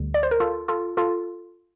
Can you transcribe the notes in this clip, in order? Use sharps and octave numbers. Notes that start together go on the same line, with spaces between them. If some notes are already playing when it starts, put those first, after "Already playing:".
Already playing: D2 D3 G3
D5
C5
A#4
F4 A4
F4 A4
F4 A4